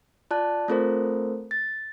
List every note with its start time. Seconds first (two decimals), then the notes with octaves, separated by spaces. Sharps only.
0.31 F4 D5 A5 F#6
0.68 A3 C4 F4 A4 A#4 C5
1.51 A6